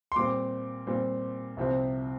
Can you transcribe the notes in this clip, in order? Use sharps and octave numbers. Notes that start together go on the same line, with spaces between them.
C6
A#2 G3 C4 D6
A#2 G3 C4
C2 C3 F3 C4